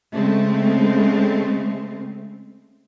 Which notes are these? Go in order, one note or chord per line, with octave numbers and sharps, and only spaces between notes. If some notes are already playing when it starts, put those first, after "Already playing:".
C#3 G#3 A3 C4